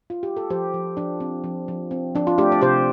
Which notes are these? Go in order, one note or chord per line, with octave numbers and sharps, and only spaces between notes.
F4
G4
A4
F3 G4 C5
F3
F3 D4
C4
F3
F3
C4
F3 D4
F4
A3 D4 G4
D5
C3 G4 C5